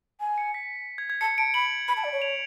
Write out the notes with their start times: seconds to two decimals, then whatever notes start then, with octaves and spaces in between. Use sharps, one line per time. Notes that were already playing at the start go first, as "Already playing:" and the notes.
0.20 G#5
0.38 C#7
0.54 B6
0.98 G#6
1.10 G#6
1.21 A5 C#7
1.38 A5 D7
1.54 B5 F#7
1.88 B5
1.97 A5
2.04 D5
2.13 C#5
2.22 F7